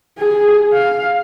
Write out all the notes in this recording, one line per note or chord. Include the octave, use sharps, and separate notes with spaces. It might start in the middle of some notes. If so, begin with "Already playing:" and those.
G#4
F5